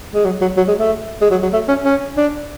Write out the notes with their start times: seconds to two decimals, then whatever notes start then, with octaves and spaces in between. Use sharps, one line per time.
0.15 G#3
0.25 F#3
0.41 F#3
0.57 F#3
0.68 G#3
0.79 A3
1.21 G#3
1.31 F#3
1.43 F#3
1.53 A3
1.68 C#4
1.85 C#4
2.17 D4